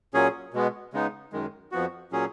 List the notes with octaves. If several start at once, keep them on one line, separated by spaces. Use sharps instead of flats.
A#2 F#3 C#4 G#4
B2 G#3 B3
C#3 G#3 B3 D#4
F#2 D#3 G#3
F2 F3 B3 F#4
A#2 F#3 C#4 G#4